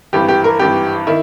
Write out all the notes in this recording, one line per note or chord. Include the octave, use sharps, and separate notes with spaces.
G#1 G2 E3 G4
G4
A#4
G#1 G2 E3 G4
D#3 E4